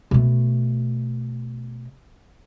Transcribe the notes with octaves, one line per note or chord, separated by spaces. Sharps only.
B2 A3